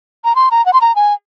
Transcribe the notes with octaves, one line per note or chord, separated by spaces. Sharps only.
A#5
C6
A#5
F#5
C6
A#5
G#5